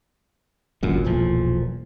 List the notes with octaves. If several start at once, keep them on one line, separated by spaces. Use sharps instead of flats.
G1 C#2 F#2 A#2
E1 B1 A#2 F3